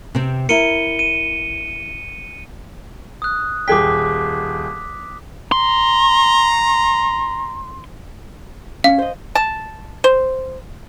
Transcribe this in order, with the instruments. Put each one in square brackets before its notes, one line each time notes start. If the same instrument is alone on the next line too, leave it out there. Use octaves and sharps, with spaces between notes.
[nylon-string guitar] C3 C4
[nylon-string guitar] E4 A#4 [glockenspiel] C#7 D#7 G7
[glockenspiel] D#7
D#6 F#6
[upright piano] D#1 G#4 G5 [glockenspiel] D6 B6
[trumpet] A#5 [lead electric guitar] C6
[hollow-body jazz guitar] C#4 [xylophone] F5
[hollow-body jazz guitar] C5 D#5
[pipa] A5
C5